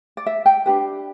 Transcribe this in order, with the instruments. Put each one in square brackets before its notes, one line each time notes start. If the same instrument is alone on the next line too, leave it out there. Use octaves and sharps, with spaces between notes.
[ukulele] D5
E5
G5
D4 G4 B4